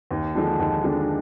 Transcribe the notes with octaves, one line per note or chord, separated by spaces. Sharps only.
D#2
D3 F3 G#3 D4
D#2
D3 F3 G#3 D4